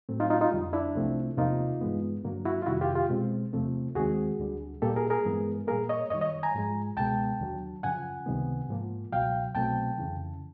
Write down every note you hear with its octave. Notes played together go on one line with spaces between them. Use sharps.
A2 F#3 A3 C4
D#4 F4
D#4 F4
D#4 F4
F2 D3 G3
D4 E4
C2 C3 F3 A3 C4
E2 C3 F3 A#3 D#4 F4
G2 E3 G#3 B3
G2 D3 F#3 A#3
E4 F#4
F4
F2 C3 D#3 G3 E4 F#4
F4 G4
F4 G4
B2 G#3 C4
E2 C3 F3 A3 C4
D#2 D#3 G#3 C4 F#4 G#4
D2 D3 G3
A#2 G3 A#3 G4 A4
G#4 A#4
G#4 A#4
G2 E3 G#3 B3
A#2 G3 A#3 G#4 A#4
C#5 D#5
F#2 D#3 G3 C#5 D#5
C#5 D#5
G#5 A#5
G#2 F3 G#3
C#2 B2 G#3 B3 G5 A5
D#2 D3 F#3
F#2 C#3 F3 F#5 G#5
C#2 C3 D#3 G3 B3
G#2 F3 A#3
C#2 B2 F#3 F5 G5
C2 B2 F#3 A3 C4 G5 A5
F2 C#3 E3